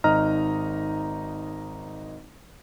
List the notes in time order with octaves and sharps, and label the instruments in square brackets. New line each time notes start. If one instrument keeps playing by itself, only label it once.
[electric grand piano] G#1 D#4 D#5 A#5 F6